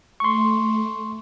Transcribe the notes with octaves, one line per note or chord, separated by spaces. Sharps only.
A3 C6 C#6